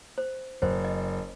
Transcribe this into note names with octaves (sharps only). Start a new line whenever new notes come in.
C5
F#1 C5
D#5